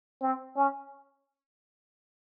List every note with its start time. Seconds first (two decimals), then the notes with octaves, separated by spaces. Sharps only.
0.22 C4
0.56 C#4